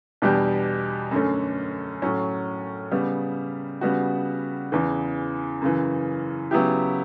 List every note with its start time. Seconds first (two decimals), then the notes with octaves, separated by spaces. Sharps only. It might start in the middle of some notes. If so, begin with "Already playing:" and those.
0.22 E2 B2 G3 D4 G4
1.11 F#2 D3 A3 C#4
2.02 A2 F#3 C#4
2.91 C#3 G3 B3
3.81 C#3 G3 B3 F#4
4.72 E2 C#3 E3
5.62 F#2 C#3 E3
6.51 C#3 F#3 B3 E4 G4